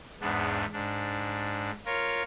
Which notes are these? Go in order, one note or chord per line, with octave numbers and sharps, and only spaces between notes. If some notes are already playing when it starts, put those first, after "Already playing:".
E2 G#2 B3 D4
G#2 D4
F4 A#4 C#5